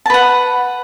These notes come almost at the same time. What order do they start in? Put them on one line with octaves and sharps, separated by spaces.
A5 B4 F#5